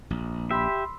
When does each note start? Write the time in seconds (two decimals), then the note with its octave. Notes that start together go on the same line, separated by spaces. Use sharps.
0.11 A#1
0.51 G4 E5 B5 C6 E6